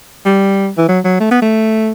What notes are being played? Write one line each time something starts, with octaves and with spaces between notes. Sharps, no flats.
G3
E3
F#3
F#3
A3
B3
A3